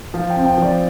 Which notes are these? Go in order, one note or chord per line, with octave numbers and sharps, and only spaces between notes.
F3
G5
C4
G5
F3 D5